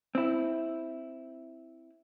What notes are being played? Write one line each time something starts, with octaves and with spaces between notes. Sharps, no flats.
C4 E4